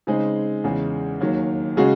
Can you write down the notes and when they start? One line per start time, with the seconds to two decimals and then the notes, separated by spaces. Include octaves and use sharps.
0.07 C#3 G#3 C4 D#4
0.64 E2 C#3 G#3
1.20 D#2 D#3 F#3
1.77 C#3 G#3 C#4 F#4